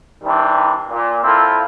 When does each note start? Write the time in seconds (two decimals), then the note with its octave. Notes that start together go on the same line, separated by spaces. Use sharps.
0.23 C3 D#3 E3 G3 D4
0.90 A#2
1.23 A#3 C4 E4 F4 A4